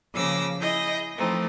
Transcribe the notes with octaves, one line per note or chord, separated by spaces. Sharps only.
C#3 F3 A#3 D6 E6 A#6
E4 G#4 D#5 G6 A#6
E3 F3 A3 C4 D#4